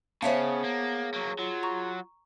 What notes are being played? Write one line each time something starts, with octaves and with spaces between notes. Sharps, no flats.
C#3 B3 G#4 C5 C#5 E5 F5 A5
A#3
F#3 A#3
F#3 F4
A#5 C#6